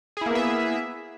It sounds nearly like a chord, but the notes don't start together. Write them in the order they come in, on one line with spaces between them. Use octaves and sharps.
G#4 E4 A#3 B3 E5